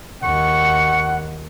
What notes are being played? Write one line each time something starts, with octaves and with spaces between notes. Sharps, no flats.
D#2 F#5 C#6